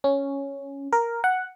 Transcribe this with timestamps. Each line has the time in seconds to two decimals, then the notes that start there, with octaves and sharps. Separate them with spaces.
0.04 C#4
0.93 A#4
1.24 F#5